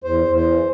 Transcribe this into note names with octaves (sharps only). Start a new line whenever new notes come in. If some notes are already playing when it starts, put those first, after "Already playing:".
E2 C5
E2
C5
E3